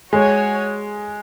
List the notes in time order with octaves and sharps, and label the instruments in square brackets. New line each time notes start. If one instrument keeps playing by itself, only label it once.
[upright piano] G#3 [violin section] F#4 C#5 G#5